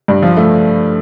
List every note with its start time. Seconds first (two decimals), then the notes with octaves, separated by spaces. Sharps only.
0.08 G2
0.22 F3
0.37 A3